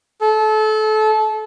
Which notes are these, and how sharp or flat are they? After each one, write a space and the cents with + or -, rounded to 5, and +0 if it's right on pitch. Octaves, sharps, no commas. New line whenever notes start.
A4 -30